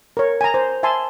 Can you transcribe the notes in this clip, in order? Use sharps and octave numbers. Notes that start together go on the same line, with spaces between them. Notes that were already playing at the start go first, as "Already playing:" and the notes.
A#4 C#5
G#5 A#5
C5
E5 G#5 A5 C6